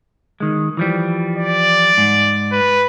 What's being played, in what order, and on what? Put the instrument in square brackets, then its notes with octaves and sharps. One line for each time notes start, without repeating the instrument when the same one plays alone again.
[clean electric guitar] D#3 G#3
E3 F3 G3
[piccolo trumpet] D5
[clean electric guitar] G#2
[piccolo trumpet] B4